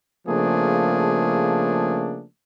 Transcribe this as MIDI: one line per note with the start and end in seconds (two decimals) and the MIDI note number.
0.27 2.25 49
0.27 2.25 53
0.27 2.25 57
0.27 2.25 58
0.27 2.25 62
0.27 2.25 68